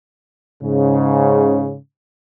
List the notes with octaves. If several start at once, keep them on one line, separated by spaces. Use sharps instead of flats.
G#2 C#3